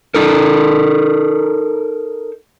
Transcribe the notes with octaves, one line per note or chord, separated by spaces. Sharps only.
D#4 A4 A#4